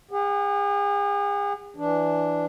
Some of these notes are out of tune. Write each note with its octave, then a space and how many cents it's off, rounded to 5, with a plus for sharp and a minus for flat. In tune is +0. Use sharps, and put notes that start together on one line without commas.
G#4 -40 F#5 +10
E3 +0 D4 +0